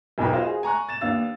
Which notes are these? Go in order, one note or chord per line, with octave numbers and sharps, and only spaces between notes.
E1 B1 D#4 B4 G5 B5
F4 F#4 C5 D#5 F5
G#4
G#5 A#5 C#6 F#6
A6 E7
D#2 B3 D4 F5 E6 A6